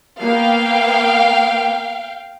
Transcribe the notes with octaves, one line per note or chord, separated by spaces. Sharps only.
A#3 B3 F5 G5